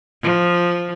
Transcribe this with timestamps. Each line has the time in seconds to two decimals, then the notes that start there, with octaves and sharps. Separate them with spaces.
0.22 F3